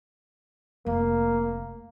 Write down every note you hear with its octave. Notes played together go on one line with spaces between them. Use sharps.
F1 A#3